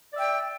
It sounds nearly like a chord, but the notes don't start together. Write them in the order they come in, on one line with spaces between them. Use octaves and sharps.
D5 E5 G5